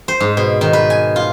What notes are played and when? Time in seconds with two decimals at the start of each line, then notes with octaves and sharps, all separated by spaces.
0.08 C5
0.20 G#2
0.37 B2
0.61 D#3
0.73 B4
0.90 G#5
1.16 F4